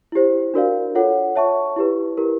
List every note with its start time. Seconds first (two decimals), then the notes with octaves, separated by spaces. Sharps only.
0.12 E4 G4 C5
0.54 D4 F#4 A#4 D5 F5
0.95 F4 A4 C#5 F#5
1.36 C#5 E5 A5 C#6
1.76 E4 G4 B4
2.17 E4 G4 A#4